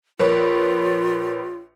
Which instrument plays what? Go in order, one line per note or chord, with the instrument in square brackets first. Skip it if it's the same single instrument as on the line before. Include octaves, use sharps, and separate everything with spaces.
[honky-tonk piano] A#1 B4 C#5 [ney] F4 [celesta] A#4